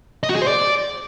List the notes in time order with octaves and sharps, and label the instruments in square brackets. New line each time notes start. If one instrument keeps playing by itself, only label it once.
[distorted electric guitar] D#5
F#4
G#4
C5
D5